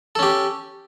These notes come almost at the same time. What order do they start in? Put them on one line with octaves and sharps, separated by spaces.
A4 C#4 G4